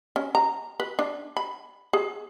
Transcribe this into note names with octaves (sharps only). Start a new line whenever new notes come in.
C#4
A#5
B4
D4
B5
G#4